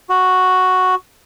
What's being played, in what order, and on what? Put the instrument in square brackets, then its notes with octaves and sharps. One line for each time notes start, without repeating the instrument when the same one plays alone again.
[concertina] F#4